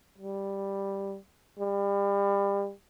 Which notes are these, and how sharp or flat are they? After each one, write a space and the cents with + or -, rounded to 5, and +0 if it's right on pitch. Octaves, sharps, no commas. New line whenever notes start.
G3 +5
G3 +30